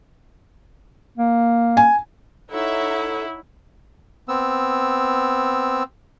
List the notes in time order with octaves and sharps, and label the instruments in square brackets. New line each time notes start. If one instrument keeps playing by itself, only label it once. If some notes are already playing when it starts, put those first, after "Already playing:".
[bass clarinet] A#3
[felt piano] G#5
[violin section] D#4 E5 [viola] E4 [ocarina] A4 [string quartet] C#5 F#5
[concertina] B3 C4 E6